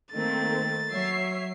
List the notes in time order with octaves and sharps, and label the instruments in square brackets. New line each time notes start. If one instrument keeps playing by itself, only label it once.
[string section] D#3 [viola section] A3 A#3 C4 [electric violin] A6
[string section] F#3 C7 [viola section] C#5 E5